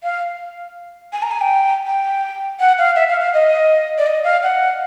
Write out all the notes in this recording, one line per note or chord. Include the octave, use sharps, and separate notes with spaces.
F5
G#5
A#5
G#5
G5
G5
F#5
F5
E5
F5
F5
D#5
D5
D#5
F5
F#5